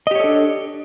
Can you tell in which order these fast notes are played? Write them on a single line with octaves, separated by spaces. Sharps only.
D#5 G4 C#5 A4 D4